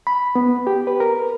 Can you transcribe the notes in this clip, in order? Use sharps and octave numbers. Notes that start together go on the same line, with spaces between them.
B5
B3
G4
B4
A#4